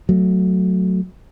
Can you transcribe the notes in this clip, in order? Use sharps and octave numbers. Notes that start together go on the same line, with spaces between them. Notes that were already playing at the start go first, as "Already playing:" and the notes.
F#3 A3